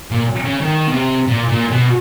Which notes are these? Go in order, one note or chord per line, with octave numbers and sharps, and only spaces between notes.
A#2
C#3
D#3
B2
C3
A#2
A#2
B2